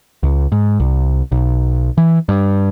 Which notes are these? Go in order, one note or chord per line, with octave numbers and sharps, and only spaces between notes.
C#2
G#2
C2
B1
E3
G2